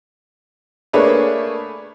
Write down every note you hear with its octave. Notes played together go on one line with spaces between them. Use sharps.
A3 A#3 D4 G#4 B4 C#5